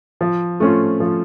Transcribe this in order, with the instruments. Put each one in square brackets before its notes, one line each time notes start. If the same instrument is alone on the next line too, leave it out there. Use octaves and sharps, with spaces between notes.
[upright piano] F3
A3 C#4 F4
F3